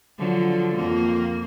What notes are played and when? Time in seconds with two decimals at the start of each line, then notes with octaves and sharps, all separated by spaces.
0.18 D3 F3 F#3
0.76 F2 A#3